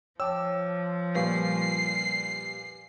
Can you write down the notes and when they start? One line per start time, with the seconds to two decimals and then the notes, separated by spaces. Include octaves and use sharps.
0.20 F3 C#5 G5 A5 D6 E6
1.15 A#2 G3 B4 F5 G#5 C#6 C7